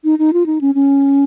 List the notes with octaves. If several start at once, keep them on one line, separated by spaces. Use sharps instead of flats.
D#4
D#4
F4
D#4
C#4
C#4